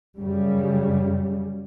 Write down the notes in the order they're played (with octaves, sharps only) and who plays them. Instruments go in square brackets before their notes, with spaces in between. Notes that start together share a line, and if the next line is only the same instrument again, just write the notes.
[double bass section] F#2 C#3 G3